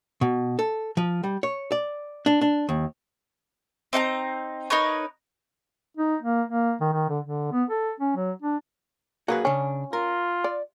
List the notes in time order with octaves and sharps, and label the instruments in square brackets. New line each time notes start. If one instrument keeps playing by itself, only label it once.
[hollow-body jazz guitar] B2
A4
F3
G3
C#5
D5
D4
D4
D#2
[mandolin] C4 D#4 F#5 A#5
D#4 A#4 B4 C#5
[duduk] D#4
A#3
A#3
D#3
D#3
D3
D3
B3
A4
C#4
F#3
D4
[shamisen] F#3 A#3 [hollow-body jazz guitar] F#4 G#4 B4
[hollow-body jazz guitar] C#3 D4 [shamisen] C#4
[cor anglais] F4 [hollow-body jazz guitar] A#4
[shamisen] D5